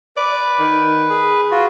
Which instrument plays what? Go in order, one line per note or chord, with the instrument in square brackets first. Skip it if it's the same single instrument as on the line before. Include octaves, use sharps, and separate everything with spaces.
[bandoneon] B4 [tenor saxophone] D5
[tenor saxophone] D#3
G#4
[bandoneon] F4 F#4